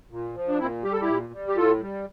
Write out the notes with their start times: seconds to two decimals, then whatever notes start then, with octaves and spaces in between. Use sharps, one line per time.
0.11 A#2
0.35 F3
0.48 D4
0.59 A#2 C4 E4
0.84 G3 G4
0.92 A4
1.01 E4 G4
1.08 A#2
1.33 G3
1.48 G4
1.57 A2 F4 A4
1.81 G3